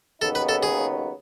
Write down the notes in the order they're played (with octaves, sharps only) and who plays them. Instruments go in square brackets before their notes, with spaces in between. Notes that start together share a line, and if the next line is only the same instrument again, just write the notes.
[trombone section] D#2 C#3 F#3 B3 D#4 [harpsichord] A4
[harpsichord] B4
A4
G#4